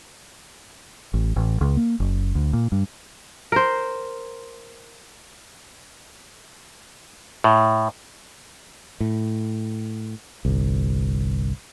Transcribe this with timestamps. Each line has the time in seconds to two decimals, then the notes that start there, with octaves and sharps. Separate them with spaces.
1.14 A1
1.36 A1
1.61 C#2
1.77 A#3
2.00 F#1
2.35 D2
2.53 A#2
2.72 G2
3.52 A#4 C5
7.44 A2
9.00 A2
10.45 G1 C2